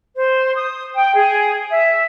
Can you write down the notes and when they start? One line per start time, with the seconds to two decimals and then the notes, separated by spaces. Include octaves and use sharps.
0.15 C5
0.55 D#6
0.95 G5
1.15 G#4
1.71 E5